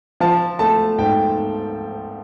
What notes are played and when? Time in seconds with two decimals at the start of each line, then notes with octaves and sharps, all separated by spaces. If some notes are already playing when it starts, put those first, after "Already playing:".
0.20 F3 A5
0.59 A3 A5
0.98 G#2 G5